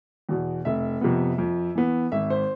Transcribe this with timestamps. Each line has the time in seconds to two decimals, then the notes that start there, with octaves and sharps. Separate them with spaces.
0.29 E2 B2
0.65 F1 E5
1.01 F2 C3 F3 B3
1.38 F2
1.75 E3 B3
2.12 G#1 E5
2.30 C5